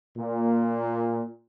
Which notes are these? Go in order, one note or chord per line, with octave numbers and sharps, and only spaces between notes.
A#2